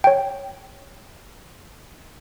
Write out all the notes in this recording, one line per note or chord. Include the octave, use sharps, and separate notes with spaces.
C#5 G5